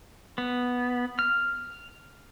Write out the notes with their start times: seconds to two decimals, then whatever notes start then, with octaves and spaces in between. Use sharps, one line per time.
0.38 B3
1.19 F6